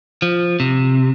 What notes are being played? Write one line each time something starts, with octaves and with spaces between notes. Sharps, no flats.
F3
C3